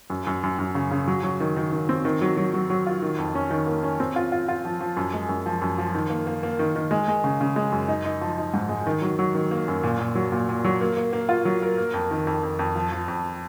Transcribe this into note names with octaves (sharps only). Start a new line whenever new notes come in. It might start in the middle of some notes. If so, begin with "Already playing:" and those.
F#2
F#2
F#2
F#2
C#3
C#3
F#3
F#3
D#3
D#3
D#3
C4
D#3
F#3
F#3
F#3
F#3
F4
D#3
F2
C#4
D#3
A#3
C#4
C4
F4
F4
F4
F3
F3
F#2
G#3
F#2
F3
F#2
F3
D#3
A#3
A#3
A#3
D#3
D#3
G#3
G#3
C#3
C#3
G#3
F#2
D#4
D#4
F3
D#4
G#2
G#3
D#3
F#3
F#3
D#3
A#3
F#2
A#2
A#2
F#3
A#2
A#2
F#3
A#3
A#3
A#3
F4
F#3
A#4
A#3
F2
D#3
F2
F2
F2
F3
F3
F2